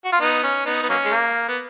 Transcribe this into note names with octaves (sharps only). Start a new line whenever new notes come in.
F#4
F4
B3 D#4
C#4
B3 D#4
B3
F#3 A#3 C#4
G#3
A#3
B3